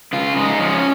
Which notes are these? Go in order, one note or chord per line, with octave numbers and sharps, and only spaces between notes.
C#3 F4
G#3 D#4
F3 C#4